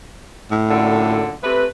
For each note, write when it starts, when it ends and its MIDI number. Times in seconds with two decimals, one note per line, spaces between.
0.51 1.23 45
0.70 1.33 42
0.70 1.33 46
0.70 1.33 50
1.43 1.66 48
1.43 1.66 57
1.43 1.66 71